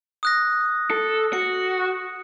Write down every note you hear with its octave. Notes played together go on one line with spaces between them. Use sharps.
D#6 F#6 A#6
A4
F#4 C#7